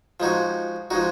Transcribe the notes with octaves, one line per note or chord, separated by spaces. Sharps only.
F3 G#3 D#4 F#4
F3 G#3 D#4 F#4